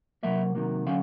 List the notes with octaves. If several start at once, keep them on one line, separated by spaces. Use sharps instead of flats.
C3 D#3 F#3 A#3 E5
C3 D#3 F#3 A#3
D3 F#3 C#4 F5